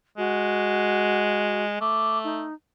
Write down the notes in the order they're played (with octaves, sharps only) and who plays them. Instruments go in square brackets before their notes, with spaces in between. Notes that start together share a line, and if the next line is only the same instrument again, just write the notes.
[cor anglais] G#3 [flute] F#4
[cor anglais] A3 [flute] D6
[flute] D#4